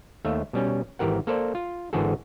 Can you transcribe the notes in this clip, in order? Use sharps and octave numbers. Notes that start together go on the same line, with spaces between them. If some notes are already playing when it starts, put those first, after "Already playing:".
D#2 A3 E5 F5
B2 G3 C#4
G#1 E3 G4 A#4 F#5
A#3 A4 C5 D5
F4
G#1 D3 E3 F#4 G#4 A4